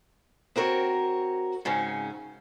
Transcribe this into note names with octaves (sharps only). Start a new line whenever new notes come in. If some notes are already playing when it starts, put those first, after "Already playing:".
C4 F#4 A#4 C#5
G#2 C#3 C4 C#4